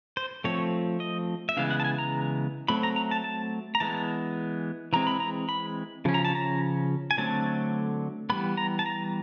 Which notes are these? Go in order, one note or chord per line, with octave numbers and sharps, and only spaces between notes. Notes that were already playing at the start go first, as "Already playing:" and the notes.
C5
F3 A3 C4 C#5
D#5
E5
C#3 E3 G#3 B3 F5
F#5
A5
G#5
A#5
F#3 A3 C4 B5
A#5
A#5
A5
A5
A#5
E3 G#3 B3 A5
E3 G#3 C4 A#5
B5
A#5
B5
C#3 F3 C#4
A#5
A5
A#5
G#5
D3 F#3 A3 C4 A5
E3 G3 B3 B5
A#5
A5
A#5